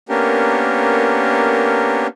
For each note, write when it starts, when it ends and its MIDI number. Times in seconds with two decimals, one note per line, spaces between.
0.09 2.07 58
0.09 2.07 59
0.09 2.07 61
0.09 2.07 62
0.09 2.07 67
0.09 2.07 70